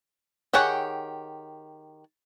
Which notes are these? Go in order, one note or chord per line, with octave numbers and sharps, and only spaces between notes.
D#3 G4 G#4 C#5 F#5